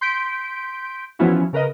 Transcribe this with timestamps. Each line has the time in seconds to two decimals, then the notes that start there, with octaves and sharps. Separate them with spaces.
0.01 C6 G6 B6 D7
1.19 E3 F3 B3 C#4 E4 F#4
1.53 C#3 A#4 B4 D#5